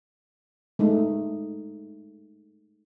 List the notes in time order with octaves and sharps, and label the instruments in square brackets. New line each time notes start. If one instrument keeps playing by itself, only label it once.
[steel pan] G#3 A3 D#4